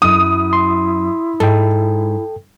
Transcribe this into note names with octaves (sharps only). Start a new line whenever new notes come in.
F#2 E4 D#6
C6
G#2 A4 G5